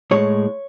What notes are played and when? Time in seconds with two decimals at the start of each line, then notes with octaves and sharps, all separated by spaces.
0.11 A2 G#3 C#5